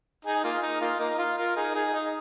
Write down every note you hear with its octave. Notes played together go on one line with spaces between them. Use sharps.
D#4 G#4
A#3 F4
D#4
A#3 F4
A#3 D#4
F4
F4 A#4
D#4 G#4
D#4 G#4
D#4